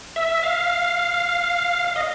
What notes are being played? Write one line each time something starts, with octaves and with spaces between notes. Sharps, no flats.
E5
F5
D#5